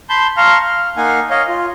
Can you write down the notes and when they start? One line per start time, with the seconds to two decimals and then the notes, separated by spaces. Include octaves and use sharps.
0.09 A5 B5 C6 G6
0.37 F5 A5 A#5 C6 C#6 F6
0.62 F6
0.97 A#3 D#4 F5 F#5 G#5
1.30 C#5 D#5 F5
1.48 F4